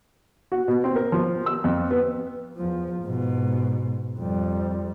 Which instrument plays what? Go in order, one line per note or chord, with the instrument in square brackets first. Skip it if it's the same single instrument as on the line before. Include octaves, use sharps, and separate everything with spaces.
[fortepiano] F#4
B2
C4
A#4
F3
E6
F2
B3
[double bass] E2 F3
G#2 B2
F2 G3